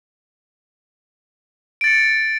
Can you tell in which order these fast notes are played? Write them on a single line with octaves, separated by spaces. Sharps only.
D7 A6 C#7